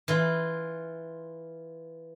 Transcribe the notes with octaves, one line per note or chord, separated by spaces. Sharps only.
E3 F4